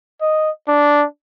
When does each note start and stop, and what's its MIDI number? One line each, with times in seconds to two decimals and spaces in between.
0.21 0.50 75
0.68 1.05 62